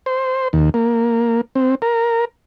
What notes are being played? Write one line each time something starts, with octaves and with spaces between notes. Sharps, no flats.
C5
D#2
A#3
C4
A#4